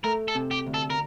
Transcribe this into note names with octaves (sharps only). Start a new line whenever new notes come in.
A3 A#4
A4
C3
G4
D2
A4
A#4